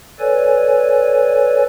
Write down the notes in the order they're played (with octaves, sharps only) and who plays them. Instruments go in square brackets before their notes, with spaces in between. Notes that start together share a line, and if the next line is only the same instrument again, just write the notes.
[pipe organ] A4 B4 C#5 D5 G#5